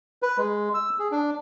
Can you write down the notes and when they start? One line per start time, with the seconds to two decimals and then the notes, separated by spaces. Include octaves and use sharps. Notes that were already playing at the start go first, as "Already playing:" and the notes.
0.23 B4
0.38 G#3
0.74 E6
0.99 G#4
1.12 D4